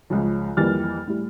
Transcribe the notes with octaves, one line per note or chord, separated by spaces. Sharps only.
C#2 C#3 F3 C#4
F2 E3 G3 A#3 F6 A6
A2 G3